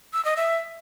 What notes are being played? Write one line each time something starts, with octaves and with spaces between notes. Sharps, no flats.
E6
D#5
E5